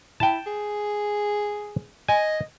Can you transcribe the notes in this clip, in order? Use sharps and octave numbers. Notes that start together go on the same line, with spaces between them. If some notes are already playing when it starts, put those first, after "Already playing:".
E4 G5 A5
G#4
D#5 G#5